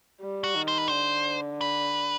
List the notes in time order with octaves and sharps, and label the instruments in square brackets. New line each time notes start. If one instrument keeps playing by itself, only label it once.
[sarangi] G3
[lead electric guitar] F#4
[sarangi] D#3
[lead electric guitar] C5
B4
[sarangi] D3 [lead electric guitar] C5
[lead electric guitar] B4